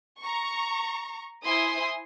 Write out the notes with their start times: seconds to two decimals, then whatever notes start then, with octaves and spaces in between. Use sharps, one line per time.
0.21 A#5 C#6
1.45 E4 C5 G#5 C6 D#6